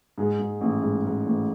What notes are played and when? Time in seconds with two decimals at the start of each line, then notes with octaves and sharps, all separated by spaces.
0.18 G#2 G#4
0.39 G#2
0.61 A1
0.82 G#2
1.05 G#2
1.26 A1